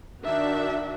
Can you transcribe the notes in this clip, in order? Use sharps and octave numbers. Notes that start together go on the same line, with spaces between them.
D#3 D4 F#4 E5